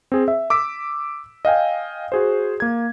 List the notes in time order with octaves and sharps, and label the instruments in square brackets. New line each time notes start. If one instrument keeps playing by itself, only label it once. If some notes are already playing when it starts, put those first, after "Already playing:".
[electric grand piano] C4 G#4
E5
D6 E6 B6 D7
D#5 F5 G5 G#5
F#4 G#4 C5
A#3 G#6